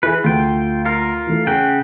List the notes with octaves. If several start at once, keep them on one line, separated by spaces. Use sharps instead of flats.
E3 E4 G#4 B4
D2 F4 G5
F4 A#4
E3 A3
C#3 G#4 F#5 G5